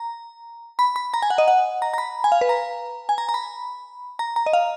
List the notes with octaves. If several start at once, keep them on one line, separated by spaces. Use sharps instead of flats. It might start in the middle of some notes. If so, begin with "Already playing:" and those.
Already playing: A#5
B5
B5
A#5
G#5
F#5
D#5
F#5
A#5
A#5
B5
G#5
F5
B4
A#5
G#5
A#5
A#5
B5
A#5
A#5
D#5
F5